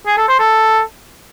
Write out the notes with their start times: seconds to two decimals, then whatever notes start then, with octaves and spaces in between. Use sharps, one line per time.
0.06 G#4
0.17 A4
0.28 C5
0.39 A4